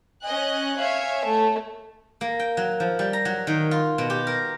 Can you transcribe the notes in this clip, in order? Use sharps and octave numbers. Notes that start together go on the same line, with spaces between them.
C#4 D#5 G#5 F#6
C#5 E5 F5
A3
A#3
G5
F#3
F3
G3
A#5
F#3
D#3
F4
B2
G4
A#4